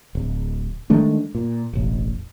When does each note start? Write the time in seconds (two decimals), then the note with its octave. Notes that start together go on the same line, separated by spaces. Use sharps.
0.15 D1
0.90 D#3 G#3 A3 D4
1.35 A#2
1.73 E1 A1